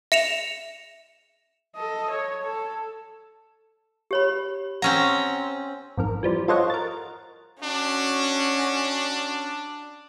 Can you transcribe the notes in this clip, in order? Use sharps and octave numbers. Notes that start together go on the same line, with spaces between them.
E5 C#7 E7 F7
A4 D#5
C#5
A4
G4 C#5 B5
C4 C#4 F#5 A#5
G#1 F2 A#4
E3 F3 G3
F4 A4 C5 C#5 D#5 F#5
A#4 A6
C#4 D4 F#4